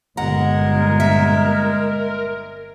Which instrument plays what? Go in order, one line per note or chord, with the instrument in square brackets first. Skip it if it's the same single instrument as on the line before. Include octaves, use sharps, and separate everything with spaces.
[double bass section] G1 A#2 [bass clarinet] G#3 [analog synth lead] A#4 [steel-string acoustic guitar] F#5
[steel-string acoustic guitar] E5